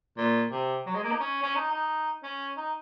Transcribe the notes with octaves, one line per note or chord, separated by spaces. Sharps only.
A#2
C3
F#3
G#3
A#3
D#4
C#4
C#4
D#4
D#4
C#4
D#4